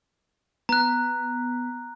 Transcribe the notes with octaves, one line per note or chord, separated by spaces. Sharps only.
B3 A#5 F#6